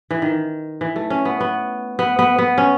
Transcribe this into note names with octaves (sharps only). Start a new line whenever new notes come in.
E3
D#3
E3
A3
C#4
B3
B3
B3
B3
B3
C#4